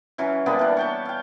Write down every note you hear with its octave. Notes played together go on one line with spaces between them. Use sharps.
E3 F#3 C#4
D3 G3 A#3 B3
E3 D4
C#5 G5 A5
F5 G5